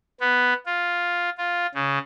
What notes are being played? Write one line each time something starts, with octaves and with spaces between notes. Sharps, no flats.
B3
F4
F4
C#3